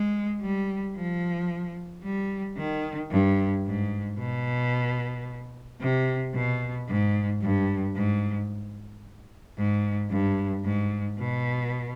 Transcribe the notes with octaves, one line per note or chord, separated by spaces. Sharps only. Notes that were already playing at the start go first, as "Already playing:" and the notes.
Already playing: G#3
G3
F3
G3
D#3
G2
G#2
B2
C3
B2
G#2
G2
G#2
G#2
G2
G#2
B2